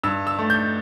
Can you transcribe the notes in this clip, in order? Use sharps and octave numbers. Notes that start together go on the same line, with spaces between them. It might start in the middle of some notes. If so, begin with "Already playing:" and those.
G2 E6
E6
A3
G6